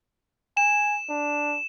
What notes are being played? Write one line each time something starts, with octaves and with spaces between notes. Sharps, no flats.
G#5 E7
D4